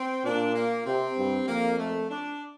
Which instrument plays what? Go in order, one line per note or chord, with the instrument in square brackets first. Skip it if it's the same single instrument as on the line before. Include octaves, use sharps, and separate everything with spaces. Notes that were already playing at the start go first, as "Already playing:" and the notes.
Already playing: [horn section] C4
[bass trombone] A#2 [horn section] D4
[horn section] A#3
[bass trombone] C3 [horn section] C4
[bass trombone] G2
[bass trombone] F2 [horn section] A#3
[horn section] A3
D4